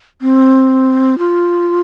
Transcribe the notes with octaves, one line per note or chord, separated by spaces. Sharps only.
C4
F4